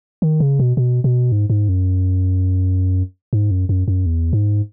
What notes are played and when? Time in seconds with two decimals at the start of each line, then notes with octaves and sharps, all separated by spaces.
0.22 D#3
0.40 C#3
0.60 B2
0.77 B2
1.04 B2
1.32 G#2
1.50 G#2
1.69 F#2
3.33 G#2
3.51 F#2
3.69 F#2
3.88 F#2
4.06 E2
4.33 G#2